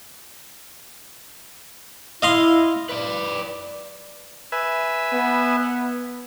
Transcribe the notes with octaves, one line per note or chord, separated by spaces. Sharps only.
E4 D#5 F5 C6
B4 D5
B4 E5 G#5
B3